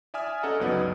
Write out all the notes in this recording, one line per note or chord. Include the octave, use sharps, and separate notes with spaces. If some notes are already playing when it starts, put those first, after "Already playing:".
D5 E5 G#5 D#6 F6
C#4 G#4 A4 D#5 F#5 A#5
G1 C#2 F#3 B3 D#4 D5